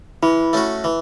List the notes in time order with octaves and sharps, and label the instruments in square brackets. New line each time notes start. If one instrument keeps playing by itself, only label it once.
[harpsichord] E3 [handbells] E4
[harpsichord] A3 C#4 F#4
E3